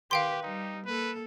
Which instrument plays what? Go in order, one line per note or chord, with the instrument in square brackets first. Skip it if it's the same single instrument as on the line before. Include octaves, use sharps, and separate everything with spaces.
[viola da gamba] D#3 B4 [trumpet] G4 [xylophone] F5 G5 C6
[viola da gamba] G3 [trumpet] D#4
[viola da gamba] A#3 A4 [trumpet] B4